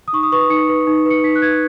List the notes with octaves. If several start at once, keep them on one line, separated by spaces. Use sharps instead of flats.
D#6
D#4 C#6
D#6
B4 C#6
D#6
D#4 C#7
B4
D#4
B4 C#7
D#4 B6
F#6
B4 G#6